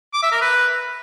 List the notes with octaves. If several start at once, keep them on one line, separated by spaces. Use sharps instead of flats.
D6
E5
A#4
B4